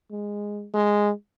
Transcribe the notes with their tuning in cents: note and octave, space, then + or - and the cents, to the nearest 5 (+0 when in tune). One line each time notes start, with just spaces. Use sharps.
G#3 -10
G#3 -5